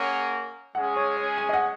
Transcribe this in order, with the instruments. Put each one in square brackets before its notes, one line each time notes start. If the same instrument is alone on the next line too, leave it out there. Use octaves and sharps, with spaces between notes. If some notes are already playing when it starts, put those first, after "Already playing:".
Already playing: [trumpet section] A#3 C#4 G#4 C#5 F#5
[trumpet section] G#3 C#4 G#4 [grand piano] F#5
[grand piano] C#5
C#5
G#5
D#5
F#5